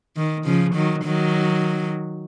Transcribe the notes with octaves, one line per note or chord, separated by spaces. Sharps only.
D#3
C#3 F3
D#3 F#3
D#3 F#3